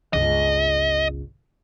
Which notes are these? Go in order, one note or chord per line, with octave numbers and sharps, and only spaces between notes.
G1 C#2 D#5